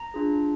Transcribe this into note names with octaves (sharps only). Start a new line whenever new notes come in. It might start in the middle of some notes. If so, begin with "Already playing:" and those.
Already playing: A#5
D4 F4 G#4